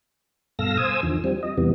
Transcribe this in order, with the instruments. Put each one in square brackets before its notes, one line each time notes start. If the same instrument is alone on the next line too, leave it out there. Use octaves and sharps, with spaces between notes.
[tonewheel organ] G2 B2 A4 F5 E6 A#6
C5 G#5 D#6 E6
E2 D3 D#3 F3
F3 G3 C4
D#5
E2 C3 E3 G3 B3